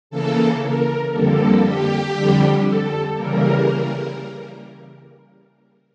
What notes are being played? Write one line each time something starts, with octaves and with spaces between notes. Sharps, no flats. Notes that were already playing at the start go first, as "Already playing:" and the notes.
C#3 E3 A#3 A4
A#4
F2 D3 G3 A#3 A4
G4
F2 D3 G3
A4
C#3 E3 G3 A#3 A#4